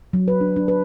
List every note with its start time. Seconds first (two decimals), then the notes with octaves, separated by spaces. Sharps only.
0.13 F#3
0.28 B4
0.41 D4
0.56 D4
0.68 B4